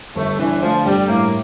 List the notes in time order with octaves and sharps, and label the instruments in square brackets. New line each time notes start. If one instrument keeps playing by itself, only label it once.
[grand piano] G1 [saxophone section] A3
[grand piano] D3 [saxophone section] E3
[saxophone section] F3 [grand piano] A3
[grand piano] G2 [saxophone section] G3
[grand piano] A2 [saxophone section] A#3